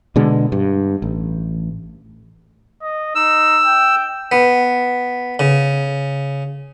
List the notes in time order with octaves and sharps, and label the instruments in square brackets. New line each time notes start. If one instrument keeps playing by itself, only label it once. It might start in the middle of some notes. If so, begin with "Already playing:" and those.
[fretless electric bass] B2 D3 G#3
G2
A1
[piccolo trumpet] D#5
[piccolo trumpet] D#4 [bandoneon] E6
[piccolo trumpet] G5
[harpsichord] B3
C#3